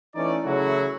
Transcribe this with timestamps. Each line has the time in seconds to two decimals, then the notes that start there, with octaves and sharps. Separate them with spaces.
0.15 E3 A3 C#4 D#4 D5
0.45 C#3 E3 F#3 A3 E4 F#4